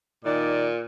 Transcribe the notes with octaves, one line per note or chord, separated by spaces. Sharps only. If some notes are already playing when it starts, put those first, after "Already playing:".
A#2 D#3 D#4 D5